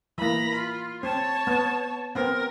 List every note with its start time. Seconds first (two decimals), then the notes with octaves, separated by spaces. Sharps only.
0.18 E3 A#3 A#5 B5
0.55 F4
1.03 C4 C#5 A5
1.47 B3
2.15 B3 C4 A#4